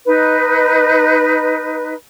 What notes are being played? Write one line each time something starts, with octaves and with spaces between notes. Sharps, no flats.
D#4 B4